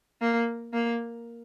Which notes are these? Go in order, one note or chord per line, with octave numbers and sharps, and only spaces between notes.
A#3
A#3